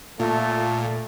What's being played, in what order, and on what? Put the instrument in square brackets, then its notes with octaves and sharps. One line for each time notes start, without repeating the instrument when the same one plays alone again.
[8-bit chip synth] A#2 [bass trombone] A3